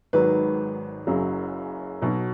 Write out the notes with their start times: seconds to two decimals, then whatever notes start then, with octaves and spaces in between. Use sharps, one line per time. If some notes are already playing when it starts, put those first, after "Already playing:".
0.13 G#1 G#2 D#3 F#3 B4
1.07 F#1 F#2 C#3 F#3
2.01 B1 B2 F#3